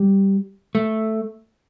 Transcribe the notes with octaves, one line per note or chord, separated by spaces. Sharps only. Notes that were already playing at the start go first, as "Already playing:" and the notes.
Already playing: G3
A3